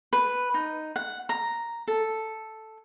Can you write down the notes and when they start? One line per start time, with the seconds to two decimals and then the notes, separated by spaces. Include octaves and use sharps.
0.13 B4
0.54 D#4
0.96 F#5
1.29 A#5
1.88 A4